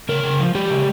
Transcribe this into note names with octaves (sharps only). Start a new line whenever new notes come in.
C#3 A#4
C#3
F3
G#3 G4
C#3